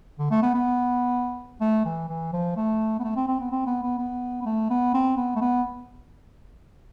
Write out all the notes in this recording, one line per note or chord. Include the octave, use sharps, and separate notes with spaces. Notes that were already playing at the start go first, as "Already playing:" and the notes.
D3
A3
B3
B3
A3
E3
E3
F3
A3
B3
A3
C4
C4
B3
C4
B3
B3
B3
B3
A3
B3
C4
B3
A3
B3